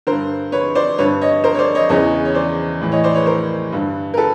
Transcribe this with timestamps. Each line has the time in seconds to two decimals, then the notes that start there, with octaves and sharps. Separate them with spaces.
0.07 G2 D3 A#4 C5
0.52 B4 C#5
0.75 C5 D5
0.98 G2 D3 B4 C#5
1.21 C#5 D#5
1.44 A#4 C5
1.54 C#5
1.59 C5 D5
1.75 C#5 D#5
1.89 E2 C#3 E3 C#5 D#5
2.25 C#5
2.35 C5 D5
2.82 A2 E3
2.92 C#5 D#5
3.04 C5 D5
3.15 B4 C#5
3.26 A#4 C5
3.72 G2 D3
4.14 A#4
4.17 A4 B4